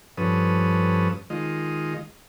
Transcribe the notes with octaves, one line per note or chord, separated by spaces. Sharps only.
G2 F3 C#4 A4 B4 D#6
D#3 G#3 F4 D#5